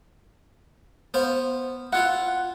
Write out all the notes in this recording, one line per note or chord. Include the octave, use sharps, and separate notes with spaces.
B3 C5 F5
E4 F4 F5 F#5